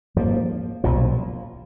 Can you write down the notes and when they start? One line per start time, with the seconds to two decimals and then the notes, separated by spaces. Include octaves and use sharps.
0.16 G#2 F3 A#3
0.84 B1 A#2 F3